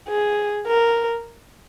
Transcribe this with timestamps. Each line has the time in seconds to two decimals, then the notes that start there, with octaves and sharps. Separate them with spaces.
0.08 G#4
0.67 A#4